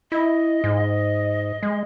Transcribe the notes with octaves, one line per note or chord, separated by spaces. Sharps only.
E4 D#5
G#2
G#3